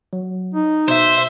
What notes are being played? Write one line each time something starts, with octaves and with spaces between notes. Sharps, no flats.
F#3
D#4
B2 C5 E5